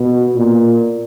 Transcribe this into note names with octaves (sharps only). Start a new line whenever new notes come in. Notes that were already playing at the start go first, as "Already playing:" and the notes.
Already playing: B2
A#2